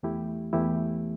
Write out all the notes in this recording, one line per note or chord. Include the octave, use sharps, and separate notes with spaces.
E2 E3 A3 E4 G4
E2 E3 A3 E4 G4